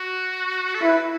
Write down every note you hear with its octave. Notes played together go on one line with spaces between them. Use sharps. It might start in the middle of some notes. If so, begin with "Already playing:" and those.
Already playing: F#4
A4
E4 B4